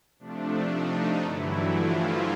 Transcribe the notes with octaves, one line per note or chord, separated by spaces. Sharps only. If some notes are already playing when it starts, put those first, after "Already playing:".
C3 F3 A3 D4
D#4
G2 D3 E3 F#3 A3 E4
F3 F4